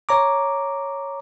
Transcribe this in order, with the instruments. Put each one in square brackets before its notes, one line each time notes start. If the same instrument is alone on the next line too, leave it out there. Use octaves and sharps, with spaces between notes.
[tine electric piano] C#5 A#5 D6